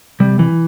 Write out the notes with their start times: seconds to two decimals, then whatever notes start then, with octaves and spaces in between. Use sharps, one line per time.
0.20 C3 G3
0.39 E3